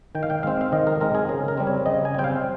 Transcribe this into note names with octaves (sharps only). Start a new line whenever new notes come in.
D#3 G5
F5
G5
G#3 C4 F5
F5
D#3 D#5
A#4
G#3 C4 A#4
G#4
C#3 A#4
A#4
G3 C4
C#5
C#3 D#5
G#5
G3 C4 G5
F5